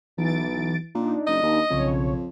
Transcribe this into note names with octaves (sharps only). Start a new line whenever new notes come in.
B1 E3 A6 D7
A#2 D4 D#4
F#1 D#5
D#2
B1 F2 C#3 C#5